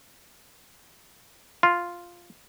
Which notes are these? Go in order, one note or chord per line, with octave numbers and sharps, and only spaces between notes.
F4